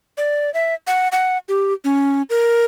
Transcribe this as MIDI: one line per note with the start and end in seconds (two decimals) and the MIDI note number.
0.18 0.53 74
0.54 0.74 76
0.87 1.08 78
1.12 1.38 78
1.49 1.73 67
1.84 2.22 61
2.30 2.65 70